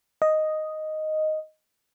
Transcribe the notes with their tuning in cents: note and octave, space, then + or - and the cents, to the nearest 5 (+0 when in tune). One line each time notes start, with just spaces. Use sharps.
D#5 +0